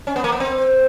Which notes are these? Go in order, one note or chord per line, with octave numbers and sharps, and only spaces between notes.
C#4
B3
A#3
B3
C4